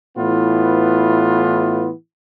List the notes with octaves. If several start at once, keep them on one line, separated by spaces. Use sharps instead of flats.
A2 E3 B3 F4